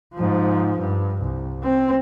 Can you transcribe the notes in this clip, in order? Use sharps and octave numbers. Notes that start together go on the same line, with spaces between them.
G#2 F3
G2
C2
C4